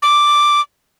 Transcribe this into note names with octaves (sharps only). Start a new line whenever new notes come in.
D6